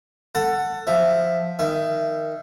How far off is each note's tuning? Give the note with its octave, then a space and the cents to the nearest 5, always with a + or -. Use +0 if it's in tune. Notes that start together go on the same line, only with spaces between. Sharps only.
A4 +20 F#5 +0 A5 +20
F3 +0 E5 +5
D#3 +0 E5 +25